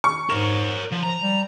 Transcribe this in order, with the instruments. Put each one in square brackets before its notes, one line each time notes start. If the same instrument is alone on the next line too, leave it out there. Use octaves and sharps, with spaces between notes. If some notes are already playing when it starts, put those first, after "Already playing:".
[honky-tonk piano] C#6
[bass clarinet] G#2 [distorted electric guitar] A#4 C#5 [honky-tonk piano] E7
[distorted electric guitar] F3
[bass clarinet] F3 [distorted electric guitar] A#5
[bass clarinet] G3